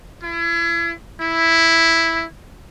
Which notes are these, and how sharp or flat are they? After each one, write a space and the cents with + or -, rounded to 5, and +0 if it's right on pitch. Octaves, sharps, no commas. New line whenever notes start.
E4 +35
E4 +0